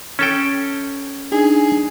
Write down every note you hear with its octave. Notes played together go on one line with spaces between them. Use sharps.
C#4 A4 G5
D4 D#4 G#4 G#5